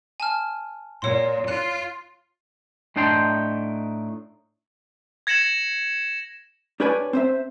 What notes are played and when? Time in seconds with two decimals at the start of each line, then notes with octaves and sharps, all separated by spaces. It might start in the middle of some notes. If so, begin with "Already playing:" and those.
0.20 G#5 A5 F6
1.02 A#2 C#5 C6
1.48 F4 F#6
2.96 A2 D4 D#4 G5 A5 C6
5.27 G#6 A#6 C#7 E7 F#7
6.80 D4 G4 B4 C#5 D5 G#5
7.13 C4 C5 E5